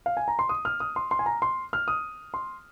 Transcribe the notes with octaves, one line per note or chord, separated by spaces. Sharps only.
F5
G#5
A#5
C6
D#6
F6
D#6
C6
C6
G#5
A#5
C6
F6
D#6
C6